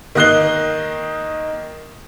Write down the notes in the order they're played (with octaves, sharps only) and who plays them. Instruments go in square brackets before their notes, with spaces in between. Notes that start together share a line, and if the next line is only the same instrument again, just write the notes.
[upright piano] D#3 A#3 D#5 F#6 C7 G7